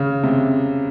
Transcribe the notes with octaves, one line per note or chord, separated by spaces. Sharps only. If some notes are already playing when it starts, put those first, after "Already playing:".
Already playing: C#3
C3